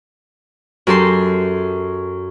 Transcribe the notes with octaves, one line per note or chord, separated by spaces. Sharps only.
F#2 G4 A4 C6